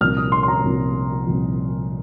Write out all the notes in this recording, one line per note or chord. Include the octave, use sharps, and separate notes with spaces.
C2 A#2 F3 F6
D#6
C6
C6
A#5
C2 A#2 F3
C2 A#2 F3